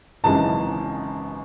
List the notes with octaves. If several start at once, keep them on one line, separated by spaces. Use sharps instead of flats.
G#1 F#2 C#3 E3 G#3 A5